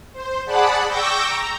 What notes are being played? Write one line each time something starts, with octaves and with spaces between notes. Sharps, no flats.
C5
G#4 D5 F#5 A5 B5
G5 C#6 D6 E6 G6 A#6
A#5